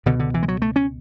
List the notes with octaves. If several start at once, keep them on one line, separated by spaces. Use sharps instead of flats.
C#2 B2 D3
D3
E3
G#3
F#3
A3
C#4